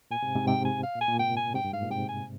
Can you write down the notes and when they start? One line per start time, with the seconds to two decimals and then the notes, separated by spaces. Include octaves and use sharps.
0.11 A#2 G#5
0.23 G#2 C3
0.35 G#2 C3
0.47 G#2 C3 G5
0.65 G#5
0.83 F5
0.95 A#2
1.01 G#5
1.08 A#2
1.19 G#2 C3 G5
1.36 G#5
1.54 G#2 C3 G5
1.64 G2
1.73 G#2 F5
1.82 A#2
1.90 G#2 C3 G5
2.08 G#5